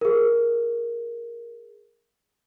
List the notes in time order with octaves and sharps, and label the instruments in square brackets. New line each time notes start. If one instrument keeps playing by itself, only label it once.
[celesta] G#4 A#4